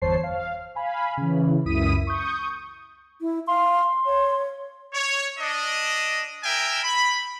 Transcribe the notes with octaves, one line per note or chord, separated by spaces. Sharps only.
G1 E2 C5 C#5 A5 C7
F5
F5 G#5 B5
C#3 E3
C#2 F#2 E4 D#6 B6 D#7
C#6 D#6 G6
E4
F5 C6
C#5
C#5
D4 D#5
A#4 E5 G5 G#5
B5